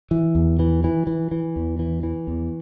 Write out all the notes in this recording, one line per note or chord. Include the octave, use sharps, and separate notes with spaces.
E3
E2
E3
E3
E3
E3
E2
E3
E3
E2